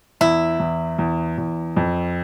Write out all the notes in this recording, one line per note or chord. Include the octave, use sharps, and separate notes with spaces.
E2 E4
E2
E2
E2
F2